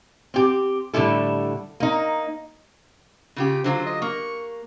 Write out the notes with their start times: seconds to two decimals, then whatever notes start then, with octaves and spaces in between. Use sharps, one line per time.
0.34 C4 G4
0.93 A2 D3 G3 E4 A4
1.80 A#3 D#4
3.36 C#3 F4 G4
3.64 D3 F#3 F4 C5
3.86 D#5
4.02 A#3 C#6